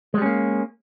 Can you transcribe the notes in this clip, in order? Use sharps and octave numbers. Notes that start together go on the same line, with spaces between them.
G3 G#3 A#3 C#4